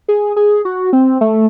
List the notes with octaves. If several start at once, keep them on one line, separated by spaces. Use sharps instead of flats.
G#4
G#4
F#4
C4
A3